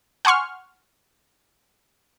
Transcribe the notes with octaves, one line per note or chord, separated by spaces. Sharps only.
F#5 G#5 C6 C#6 F6